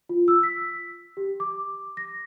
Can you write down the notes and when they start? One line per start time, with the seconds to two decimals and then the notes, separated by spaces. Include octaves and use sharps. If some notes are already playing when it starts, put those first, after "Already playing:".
0.09 F4
0.28 E6
0.43 B6
1.17 G4
1.40 D6
1.97 A#6